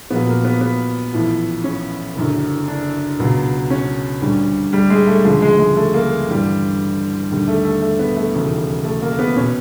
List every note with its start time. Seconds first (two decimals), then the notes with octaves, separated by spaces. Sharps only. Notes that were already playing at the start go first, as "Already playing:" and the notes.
0.10 A#1 A#2 F#3 B3
0.27 A#3
0.44 B3
0.61 B3
1.13 A1 A2 F3
1.64 C#4
2.16 F#1 F#2 D3
2.68 D4
3.19 C#2 B2 F#3
3.70 C#4
4.22 D2 D3 G3
4.73 G3
4.90 G#3
5.07 A3
5.24 D2 C#3 F3 G#3
5.42 G#3
5.59 G#3
5.77 A3
5.94 A#3
6.28 A1 G2 D3 G3
7.31 D#2 D3 G3
7.47 A3
7.64 A3
7.82 A3
7.99 B3
8.16 A3
8.34 E1 D#2 C#3
8.84 A3
9.02 A#3
9.19 B3
9.36 B2 C#4